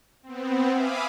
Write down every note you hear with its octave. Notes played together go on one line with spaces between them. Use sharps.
B3 C4
E5 F5 G#5 B5 D6 D#6